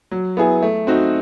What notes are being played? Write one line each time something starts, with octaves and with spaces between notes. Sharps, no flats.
F#3
B3 E4 G#4
A3
C4 D#4 F#4